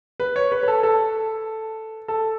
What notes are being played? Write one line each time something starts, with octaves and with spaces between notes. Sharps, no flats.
B4
C#5
B4
B4
A4
A4
A4